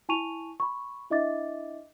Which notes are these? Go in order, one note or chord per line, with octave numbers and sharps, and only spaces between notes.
E4 G#5 A5 C#6 D#7 F7
B5 C#6
D4 E4 D#5 E5 D6 A6